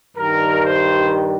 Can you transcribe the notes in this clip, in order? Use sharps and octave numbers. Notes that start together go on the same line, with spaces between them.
G2 D#3 G3 A#4
C5